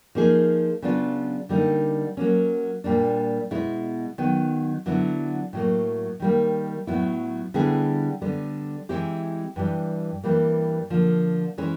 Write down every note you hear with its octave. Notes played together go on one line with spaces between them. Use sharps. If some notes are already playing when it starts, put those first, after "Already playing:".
F3 A#3 D#4 G#4
C#3 F#3 B3 D4 F4
D3 G3 A#3 D#4
F#3 A#3 C#4
A#2 G3 A#3 D4
B2 G#3 B3 E4
D#3 F#3 B3
D3 F#3 B3 E4
A2 F#3 A#3
D#3 G3 A#3
A2 F#3 B3 E4
D3 G3 B3 E4 G#4
D3 G3 B3
E3 G#3 C4 E4 G4
G2 E3 G3
G2 E3 G3 A#3
D3 F3 A#3
E3 G#3 C#4